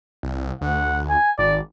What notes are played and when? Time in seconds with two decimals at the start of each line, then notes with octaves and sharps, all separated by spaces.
0.23 C2
0.61 D2 F#5
1.09 G#5
1.38 G#1 D5